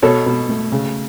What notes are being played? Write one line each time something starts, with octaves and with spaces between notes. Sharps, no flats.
B2 A4 C#5
B2
A3
C#3